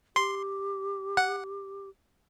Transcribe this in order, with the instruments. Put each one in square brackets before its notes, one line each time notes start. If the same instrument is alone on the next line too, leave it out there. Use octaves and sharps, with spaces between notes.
[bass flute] G4 [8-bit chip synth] C6
[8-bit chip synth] F#5